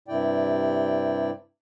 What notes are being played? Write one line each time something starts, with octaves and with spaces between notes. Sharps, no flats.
G2 C3 E4 D5 G5